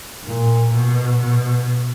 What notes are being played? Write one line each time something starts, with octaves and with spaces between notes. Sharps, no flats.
A#2
B2
B2